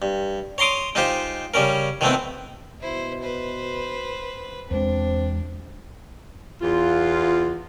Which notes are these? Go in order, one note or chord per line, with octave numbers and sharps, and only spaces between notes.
G2
C#5 A#5 C6 D6 D#6
G#3 D#4 F4 G4 C5
C#3 G3 C#4 A#4
D#3 F3 G#3 A3 B3 C4
B2 E4 C5
B4 C5
E2 G#3 C4 D4
E2 F4